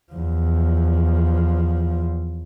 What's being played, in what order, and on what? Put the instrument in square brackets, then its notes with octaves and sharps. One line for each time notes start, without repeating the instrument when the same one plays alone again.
[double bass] E2 F3